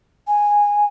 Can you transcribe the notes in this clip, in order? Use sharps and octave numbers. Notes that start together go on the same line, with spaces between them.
G#5